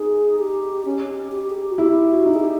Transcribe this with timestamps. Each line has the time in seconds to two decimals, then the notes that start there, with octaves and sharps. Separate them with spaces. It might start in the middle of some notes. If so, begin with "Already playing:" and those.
Already playing: D#4 G#4
0.39 G4
0.85 C#4
1.08 G4
1.32 G4
1.50 G#4
1.55 G4
1.69 F#4
1.78 E4 G4
2.10 F#4
2.25 D#4
2.34 G#4
2.40 G4